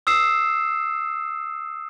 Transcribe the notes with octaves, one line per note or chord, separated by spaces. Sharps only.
D#6 E6 C7 E7